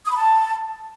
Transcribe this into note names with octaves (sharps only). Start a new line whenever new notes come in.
D#6
B5
A5